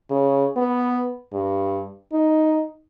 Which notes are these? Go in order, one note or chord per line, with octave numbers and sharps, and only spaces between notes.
C#3
B3
G2
D#4